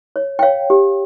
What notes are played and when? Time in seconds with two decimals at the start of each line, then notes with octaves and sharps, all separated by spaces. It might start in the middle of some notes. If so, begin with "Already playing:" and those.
0.16 C#5
0.39 G5
0.43 C#5 F5
0.70 G4